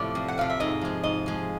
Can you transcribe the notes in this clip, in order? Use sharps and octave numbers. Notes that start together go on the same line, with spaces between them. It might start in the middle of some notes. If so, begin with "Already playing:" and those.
Already playing: A2 C3 F3 A3 C4 D5
F2
F#5
C3 F3 F5
E5
G#2 D#5
F3 G#3
G#2 D#5
F3 G#3